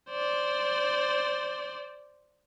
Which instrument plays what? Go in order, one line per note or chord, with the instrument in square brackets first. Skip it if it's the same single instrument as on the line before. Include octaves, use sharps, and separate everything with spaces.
[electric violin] C5 D5